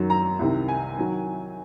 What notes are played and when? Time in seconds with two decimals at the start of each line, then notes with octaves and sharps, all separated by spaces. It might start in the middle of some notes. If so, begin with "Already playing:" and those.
Already playing: F#2 D#3 F#3
0.10 A#5
0.39 C2 C3 D#3
0.68 G#5
0.98 D#3 F#3